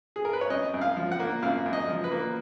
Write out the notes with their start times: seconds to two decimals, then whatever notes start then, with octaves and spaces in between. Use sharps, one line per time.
0.16 G#4
0.25 A#4
0.33 B4
0.41 C#5
0.50 F#2 D#5
0.74 F#2
0.81 F5
0.97 F3
1.12 F#5
1.20 A#3
1.42 F#2 F5
1.66 F#2
1.73 D#5
1.89 F3
2.04 B4
2.12 A#3